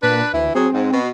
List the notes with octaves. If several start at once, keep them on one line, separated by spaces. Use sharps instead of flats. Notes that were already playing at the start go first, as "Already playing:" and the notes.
A#2 D4 B4
D2 E3 E4
F#3 C4 G#4
G#2
B2